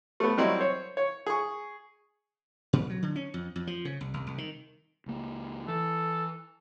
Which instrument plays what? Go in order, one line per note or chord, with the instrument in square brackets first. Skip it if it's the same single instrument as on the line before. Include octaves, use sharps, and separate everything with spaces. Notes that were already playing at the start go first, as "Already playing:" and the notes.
[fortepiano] A3 B3
F#3 G3 C4 E4 F#4 D#5
C5 C#5
C#5
G#4 C#6
[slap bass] A#2
F#3
D3
C#4
F2
F2
F3
C#3
C2
C2
C2
D#3
[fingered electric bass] C#2 A#3
[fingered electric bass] E3 [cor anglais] A4